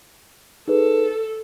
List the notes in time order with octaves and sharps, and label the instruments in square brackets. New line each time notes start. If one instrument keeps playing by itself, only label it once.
[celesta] D#4 G#4 B4 [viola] A4